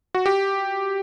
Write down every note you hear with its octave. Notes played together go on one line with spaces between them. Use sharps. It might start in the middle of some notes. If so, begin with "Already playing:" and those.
F#4
G4